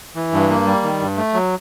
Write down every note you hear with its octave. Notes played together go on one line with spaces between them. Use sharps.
E3
G2
A#3
G3
D#3
G2
A3
F#3